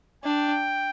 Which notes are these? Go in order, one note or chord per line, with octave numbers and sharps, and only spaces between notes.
D4 G5